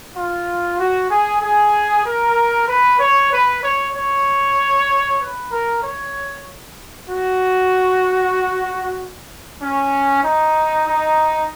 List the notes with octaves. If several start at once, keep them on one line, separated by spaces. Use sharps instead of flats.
F4
F#4
G#4
G#4
A#4
B4
C#5
B4
C#5
C#5
B4
A#4
C#5
F#4
C#4
D#4
D#4